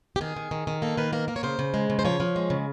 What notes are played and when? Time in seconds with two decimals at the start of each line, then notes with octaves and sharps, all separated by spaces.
0.16 G4
0.21 D#3 G#4
0.36 D#3
0.51 D#3
0.67 D#3
0.82 A#3 A4
0.97 D#3 B4
1.13 A#3 A#4
1.28 A#3 A#4
1.36 C#5
1.43 C#3 C5
1.59 C#3
1.74 G#3
1.90 C#3
1.99 C5
2.05 F3 C#5
2.20 F3
2.36 G#3
2.50 C#3